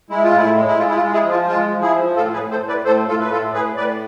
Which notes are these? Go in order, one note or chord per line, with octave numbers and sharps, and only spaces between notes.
G#3 E4
F4
A2 E4
G#3
E4
G#3 F4
E4
F4
G#3
E4 G#4
F3
F4
G#3 F4
F3
E4 G#4
F3
A2 F4 A4
G#4 B4
A2
A4 C5
A2
B4 D5
A2 A4 C5
A2 F4 A4
B4
A2 F4 A4
A2 G#4 B4
A2 B4 D5